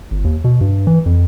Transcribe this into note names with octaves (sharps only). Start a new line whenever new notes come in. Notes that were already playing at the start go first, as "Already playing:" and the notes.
G1
D#2
B2
G2
E3
F2